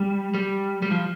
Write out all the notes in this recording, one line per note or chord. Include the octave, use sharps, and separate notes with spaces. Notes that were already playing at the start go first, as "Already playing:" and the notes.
Already playing: G3
G3
G3
F3